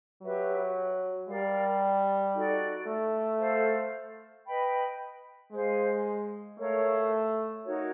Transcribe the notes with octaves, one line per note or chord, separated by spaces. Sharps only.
F#3 G4 B4 E5
G3 A#4 D5 F5
D#4 F#4 A4 D5
A3
A4 C5 F5
B4 D#5 G5 B5
G#3 G#4 C5 F5
A3 A#4 C#5 F5
D#4 F#4 A#4 C#5